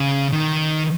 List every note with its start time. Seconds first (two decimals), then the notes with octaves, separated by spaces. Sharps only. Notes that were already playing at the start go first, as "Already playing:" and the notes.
Already playing: C#3
0.32 D#3